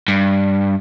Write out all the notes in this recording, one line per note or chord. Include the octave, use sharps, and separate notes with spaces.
G2